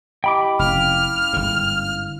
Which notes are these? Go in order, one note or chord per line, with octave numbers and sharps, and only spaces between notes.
E4 G4 D#5 G5 B5 D6
F1 C#4 E4 F5 F6
G1 G#2